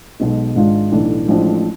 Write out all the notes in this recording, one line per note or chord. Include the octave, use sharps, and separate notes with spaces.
B1 B2 G#3
G#1 G#2 G#3 D4 F4
B1 A2 E3 A3 D4
A1 A2 F3 G#3 D4